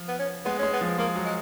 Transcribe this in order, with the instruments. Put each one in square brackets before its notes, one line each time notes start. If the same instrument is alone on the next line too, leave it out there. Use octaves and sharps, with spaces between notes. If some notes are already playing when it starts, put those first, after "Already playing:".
Already playing: [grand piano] F3
[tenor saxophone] B3
C#4
[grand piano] G#3 [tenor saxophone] B3
[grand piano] G#3 [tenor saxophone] C#4
[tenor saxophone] B3
[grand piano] F3
[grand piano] G#3 [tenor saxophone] A#3
[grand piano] F#3
[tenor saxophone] G#3